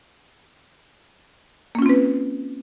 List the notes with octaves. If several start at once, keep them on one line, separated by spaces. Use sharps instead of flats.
A#3 C4 C#4 F4 B4